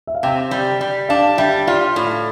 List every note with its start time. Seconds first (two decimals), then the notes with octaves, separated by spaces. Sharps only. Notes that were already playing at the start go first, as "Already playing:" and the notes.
0.07 E5
0.15 F5
0.23 C3 G5
0.51 G3
0.81 G3
1.09 D4 F5
1.38 G3 E5
1.67 F4 D5
1.96 A2